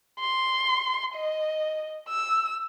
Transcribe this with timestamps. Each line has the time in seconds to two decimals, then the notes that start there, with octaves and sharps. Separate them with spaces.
0.20 C6
1.15 D#5
2.09 E6